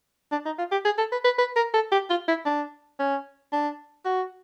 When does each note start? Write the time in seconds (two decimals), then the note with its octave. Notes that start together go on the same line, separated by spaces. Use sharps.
0.32 D4
0.46 D#4
0.59 F4
0.72 G4
0.85 G#4
0.98 A4
1.12 B4
1.25 B4
1.38 B4
1.56 A#4
1.74 A4
1.92 G4
2.10 F4
2.28 E4
2.46 D4
2.99 C#4
3.52 D4
4.05 F#4